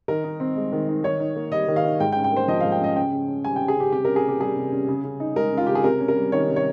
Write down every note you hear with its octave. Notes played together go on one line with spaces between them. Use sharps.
D#3 A#4
D#4
C4
G#3
D#3
D#4
D#3 C#5
D#4
A#3
G3 D#5
D#3
F5
D#4
G#2 G5
G5
C#4
G5
A#3 C5
F3 D#5
G#2 F5
G5
C#4 D#5
C#3 G5
C#3
C#4
G3 G#5
C#3 G5
G#4
C#3 G4
C3 G4
C#4 A#4
G#4
A#3 G4
G3 G#4
C3
C#4
C#3
C#3
D#4
G#3 A#4
C#3
F4
C#3 G4
G#4
C3 A#4
C#4
A#4
G3
D#3 C#5
C3
C#5